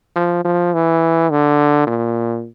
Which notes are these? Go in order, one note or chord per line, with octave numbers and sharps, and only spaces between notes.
F3
F3
E3
D3
A#2